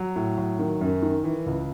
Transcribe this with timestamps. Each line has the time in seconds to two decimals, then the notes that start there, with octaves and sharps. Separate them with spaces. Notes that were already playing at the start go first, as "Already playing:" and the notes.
Already playing: F#3
0.16 A2
0.38 F#3
0.59 D#3
0.81 F#2
1.03 D#3
1.24 E3
1.46 C#2